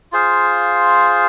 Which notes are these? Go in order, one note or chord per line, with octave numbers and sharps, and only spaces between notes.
F4 G#4 C5 F5